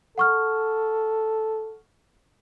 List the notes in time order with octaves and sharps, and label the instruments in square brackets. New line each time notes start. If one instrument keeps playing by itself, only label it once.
[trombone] A4 [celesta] F#5 C#6 F6